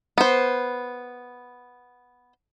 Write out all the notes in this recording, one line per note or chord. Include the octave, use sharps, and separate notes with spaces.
B3 C5